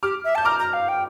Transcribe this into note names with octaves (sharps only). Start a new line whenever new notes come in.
G4 D6 F6
E5
A5 G6
A#5 D6 F6
A#5
F5
G5